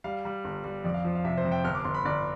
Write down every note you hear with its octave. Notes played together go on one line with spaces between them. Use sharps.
G3 F5
G3
G1
G3
F2 D5
F5
F3
F5
C3 E5
C5
F2
G5
G1 F6
D6
G1 C6
B5
G1 D5